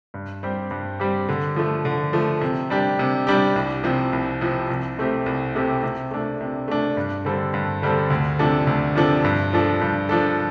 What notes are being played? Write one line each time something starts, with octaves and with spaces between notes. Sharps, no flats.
G2
G3 C4 G4
G2
G3 C4 G4
D3
F3 A3
D3
F3 A3
C3
G3 D4 G4
C3
G3 D4 G4
C2
C3 F3 C4
C2
C3 F3 C4
C2
C3 A3 C4 G4
C2
C3 A3 C4 G4
C3
A3 D4
C3
A3 D4
G2
D3 G3 C4 A4
G2
D3 G3 C4 A4
D2
C3 F3 D4 A4
D2
C3 F3 D4 A4
G2
F3 D4 A4
G2
F3 D4 A4